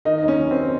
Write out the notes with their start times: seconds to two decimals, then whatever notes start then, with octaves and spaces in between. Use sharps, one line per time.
0.05 D#3 D#4
0.18 D#2 D#4
0.28 C#4
0.40 F#3
0.51 C4